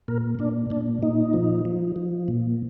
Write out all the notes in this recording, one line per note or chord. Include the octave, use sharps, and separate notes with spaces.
A#2 A#4
A#2 D4
A#2 D4
A#2 D#4
F3
F3
F3
A#2